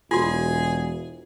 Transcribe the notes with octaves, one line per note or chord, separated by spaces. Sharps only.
E1 F4 F#4 G#4